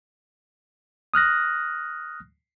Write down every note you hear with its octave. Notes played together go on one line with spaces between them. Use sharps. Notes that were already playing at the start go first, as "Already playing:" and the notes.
D#6 F6 F#6 A#6